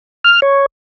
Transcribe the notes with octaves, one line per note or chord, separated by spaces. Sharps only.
F6
C#5